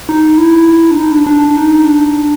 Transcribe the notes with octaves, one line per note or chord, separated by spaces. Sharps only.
D#4
E4
D4
D#4
D4
D4
D#4
D4